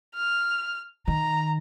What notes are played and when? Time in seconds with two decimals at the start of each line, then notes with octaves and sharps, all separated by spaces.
0.15 F6
1.07 D#3 A#5